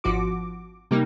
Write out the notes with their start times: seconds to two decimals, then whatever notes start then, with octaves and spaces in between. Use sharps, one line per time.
0.04 G#1 F3 F#4 D6
0.91 C3 G3 A#3 D#4